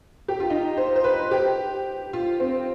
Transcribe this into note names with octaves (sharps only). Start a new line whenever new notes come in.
G4
F4
D#4
C5
C5
B4
G4
F4
C4